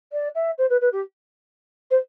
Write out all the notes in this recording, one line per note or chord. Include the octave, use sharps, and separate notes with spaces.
D5
E5
C5
B4
B4
G4
C5